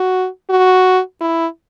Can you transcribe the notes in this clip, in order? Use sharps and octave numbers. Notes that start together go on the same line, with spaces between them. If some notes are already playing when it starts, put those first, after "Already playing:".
Already playing: F#4
F#4
E4